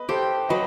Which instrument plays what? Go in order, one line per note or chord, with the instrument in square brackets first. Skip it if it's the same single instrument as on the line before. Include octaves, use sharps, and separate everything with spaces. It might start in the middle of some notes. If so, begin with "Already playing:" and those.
Already playing: [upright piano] B4 D#5
[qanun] G4 [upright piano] A4 C5
[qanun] F#3 [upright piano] B4 D#5